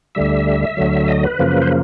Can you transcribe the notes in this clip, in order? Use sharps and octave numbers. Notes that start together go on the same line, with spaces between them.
D2 D3 G3 E5
D2 D3 F#3
D#5
B4
F#2 C#3 F3 A#3
C5